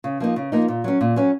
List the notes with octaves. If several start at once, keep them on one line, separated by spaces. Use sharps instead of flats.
C#3
F3 A#3 D#4
C#3
F3 A#3 D#4
A#2
F#3 C#4
A#2
F#3 C#4